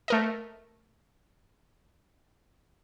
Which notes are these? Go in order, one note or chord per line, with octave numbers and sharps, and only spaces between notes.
A3 A#4 D#5